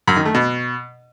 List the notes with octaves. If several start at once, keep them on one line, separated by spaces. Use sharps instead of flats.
F#2
D#3
A3
B2